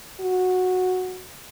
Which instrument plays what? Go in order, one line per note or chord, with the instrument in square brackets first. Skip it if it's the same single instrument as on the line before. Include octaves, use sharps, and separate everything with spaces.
[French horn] F#4